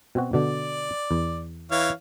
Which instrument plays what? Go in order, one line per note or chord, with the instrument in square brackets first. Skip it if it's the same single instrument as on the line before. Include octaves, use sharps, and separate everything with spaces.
[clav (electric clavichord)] B2 C4 F#4
[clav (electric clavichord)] B2 D3 [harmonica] D5
[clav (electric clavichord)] E2
[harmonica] E3 C#5 F5